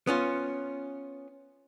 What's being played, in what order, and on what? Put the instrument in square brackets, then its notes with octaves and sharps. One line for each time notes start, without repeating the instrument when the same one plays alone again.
[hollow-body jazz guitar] B3 C#4 F4